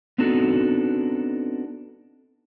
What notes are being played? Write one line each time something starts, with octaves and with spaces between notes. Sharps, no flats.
B3 C4 D4 D#4 F#4 A4